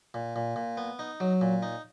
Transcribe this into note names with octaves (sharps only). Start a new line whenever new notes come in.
A#2
A#2
A#2
B3
D#4
F#3
A#2
D#4